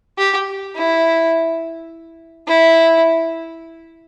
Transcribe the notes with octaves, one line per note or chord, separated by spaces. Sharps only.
G4
E4
E4